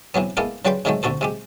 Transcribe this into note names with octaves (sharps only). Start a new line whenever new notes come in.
C3 E3 F#3 B3
G#3 A#3 B3 E4 A4 A#4
C#3 F#3 G3 B4 G5 C6
G#2 C3 D#3 F#3 G#3 A3
D2 C3 F#4 A4 C5
C3 G#3 G4